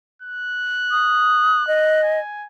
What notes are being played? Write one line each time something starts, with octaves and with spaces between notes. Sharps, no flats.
F#6
D#6
D#5
G#5